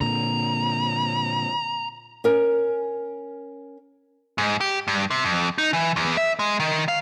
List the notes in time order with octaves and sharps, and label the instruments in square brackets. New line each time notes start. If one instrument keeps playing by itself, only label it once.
[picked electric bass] A#2 D3 [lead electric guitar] A#5
[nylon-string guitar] C#4 A#4 G#5
[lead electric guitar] G#2
G4
G2
C3
F2
D#4
E3
E2
E5
G#3
D#3
F5